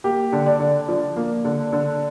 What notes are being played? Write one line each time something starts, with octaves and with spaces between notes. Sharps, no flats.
A#3 G4
D3
D5
D3
F3
A#3
D3
D3